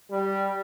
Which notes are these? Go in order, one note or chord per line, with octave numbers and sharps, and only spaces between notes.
G3